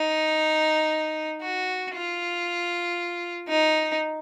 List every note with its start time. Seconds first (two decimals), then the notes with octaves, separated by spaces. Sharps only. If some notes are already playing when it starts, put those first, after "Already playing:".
Already playing: D#4
1.42 F#4
1.94 F4
3.48 D#4